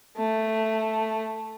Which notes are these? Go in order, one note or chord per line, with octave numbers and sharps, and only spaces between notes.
A3